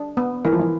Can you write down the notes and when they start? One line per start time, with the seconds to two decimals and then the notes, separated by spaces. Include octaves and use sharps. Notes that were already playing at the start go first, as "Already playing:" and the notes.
Already playing: D4
0.17 B3
0.45 E3 A#4
0.52 F3
0.59 E3